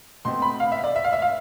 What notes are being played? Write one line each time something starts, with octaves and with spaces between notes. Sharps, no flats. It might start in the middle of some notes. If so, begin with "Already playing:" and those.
B2 A3 C4 C6
B5
F5
E5
D5
E5
F5
E5
F5